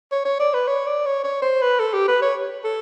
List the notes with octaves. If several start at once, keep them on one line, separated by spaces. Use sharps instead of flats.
C#5
C#5
D5
B4
C#5
D5
C#5
C#5
C5
B4
A4
G4
B4
C#5
A4